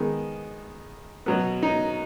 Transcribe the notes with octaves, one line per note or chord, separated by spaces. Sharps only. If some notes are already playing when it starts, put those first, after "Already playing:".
Already playing: D#3 G#3 B3
B2 F#3 B3
D#4